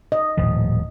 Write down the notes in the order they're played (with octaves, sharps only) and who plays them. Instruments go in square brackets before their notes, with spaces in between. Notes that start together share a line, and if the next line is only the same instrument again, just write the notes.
[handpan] D#5
[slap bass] D#1 A2 F3